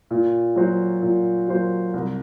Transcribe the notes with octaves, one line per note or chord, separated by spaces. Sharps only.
A#2
F#3 A#3 F#4 C5
A#2
F#3 A#3 F#4 C5
C2